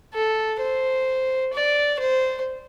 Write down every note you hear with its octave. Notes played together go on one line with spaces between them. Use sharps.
A4
C5
D5
C5